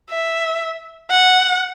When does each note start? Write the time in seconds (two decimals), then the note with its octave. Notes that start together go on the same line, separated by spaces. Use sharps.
0.10 E5
1.10 F#5